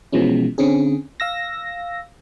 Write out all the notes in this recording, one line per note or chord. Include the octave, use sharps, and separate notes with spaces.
B2 E3 F3 G#3 C#4
D3 C4 C#4 G#4
F5 E6 A#6